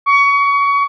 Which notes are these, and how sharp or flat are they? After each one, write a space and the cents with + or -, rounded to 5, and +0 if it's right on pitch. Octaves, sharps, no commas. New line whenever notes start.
C#6 +25